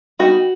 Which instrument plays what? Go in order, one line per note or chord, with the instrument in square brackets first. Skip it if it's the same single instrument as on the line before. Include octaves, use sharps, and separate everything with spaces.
[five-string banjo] G3 B3 D#4 F#4